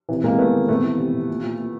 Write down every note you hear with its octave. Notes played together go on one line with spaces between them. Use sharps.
C3 E3
C3 G#3 A#3
C3 A3 B3
D#3
C3 A3 B3
E3
C3
C3
A#2
A#2
A#2